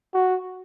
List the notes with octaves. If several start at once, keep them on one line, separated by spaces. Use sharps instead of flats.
F#4